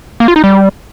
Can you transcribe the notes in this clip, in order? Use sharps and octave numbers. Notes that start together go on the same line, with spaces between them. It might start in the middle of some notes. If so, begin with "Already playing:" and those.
A#3
F4
D#4
G3